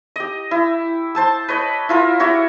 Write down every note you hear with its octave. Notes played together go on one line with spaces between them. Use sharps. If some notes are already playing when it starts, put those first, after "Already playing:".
G4 D#5
E4
C5 A5 E6
B4 C#5 D#5
E4 F4 A#4
E4 F#4 G4 C#5